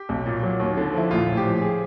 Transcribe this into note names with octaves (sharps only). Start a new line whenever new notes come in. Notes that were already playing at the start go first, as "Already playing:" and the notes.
Already playing: G4
B1
A#2
F#3
D#2
D3
F3 E4
A#1 F4
A2
G4
F3
G#4